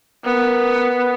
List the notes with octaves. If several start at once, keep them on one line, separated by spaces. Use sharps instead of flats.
B3 A#4